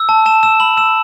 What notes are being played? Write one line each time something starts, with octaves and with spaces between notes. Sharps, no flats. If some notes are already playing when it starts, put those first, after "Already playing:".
Already playing: E6
A5
A5 E7
E6 E7
B5 F#7
E6 E7